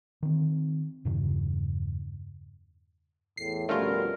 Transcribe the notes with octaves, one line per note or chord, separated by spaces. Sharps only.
D#3 C4
E2 G2 C#3
E2 A2 C7
F2 B2 G3 A3 C#4 F4 A#4